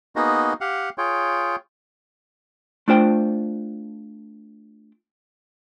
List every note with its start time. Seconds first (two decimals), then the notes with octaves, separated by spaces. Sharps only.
0.16 A#3 B3 D#4 F#4 G#4 D#5
0.61 G4 F5 F#5
0.98 F4 G#4 C#5 G5
2.88 A3 D4 F4 C5 G5